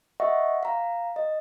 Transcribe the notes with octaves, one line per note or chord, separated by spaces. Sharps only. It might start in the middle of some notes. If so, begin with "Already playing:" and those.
D#5 E5 F#5 C#6
F5 A#5
D#5